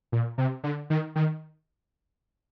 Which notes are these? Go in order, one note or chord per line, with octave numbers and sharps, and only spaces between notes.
A#2
C3
D3
D#3
D#3